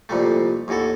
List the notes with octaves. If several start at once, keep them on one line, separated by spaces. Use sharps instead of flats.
C2 F2 A#2 G3 A3
A1 D#2 E3 F#4 A4